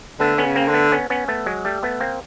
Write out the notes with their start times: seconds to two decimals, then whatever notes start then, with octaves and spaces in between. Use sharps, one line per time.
0.19 D3 A3 B3
0.38 B3 C#4
0.45 C#3
0.56 A#3 C4
0.68 D3
0.74 A3 B3
0.92 B3 C#4
1.10 B3 C#4
1.28 A3 B3
1.46 F#3 G#3
1.65 G3 A3
1.83 A3 B3
2.01 A#3 C4